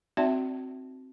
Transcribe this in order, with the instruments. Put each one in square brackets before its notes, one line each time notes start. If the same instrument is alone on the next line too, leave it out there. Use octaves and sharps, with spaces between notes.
[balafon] C4 D#4 F#4 D5 E5 A5